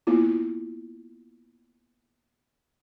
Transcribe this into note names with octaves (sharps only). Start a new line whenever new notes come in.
A#3 B3 E4 F4